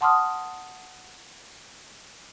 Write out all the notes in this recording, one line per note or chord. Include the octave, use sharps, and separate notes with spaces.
F#5 A5 C6 D6 D#6 F6